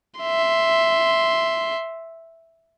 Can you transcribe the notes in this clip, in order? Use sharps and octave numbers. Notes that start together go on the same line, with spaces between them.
E5 C6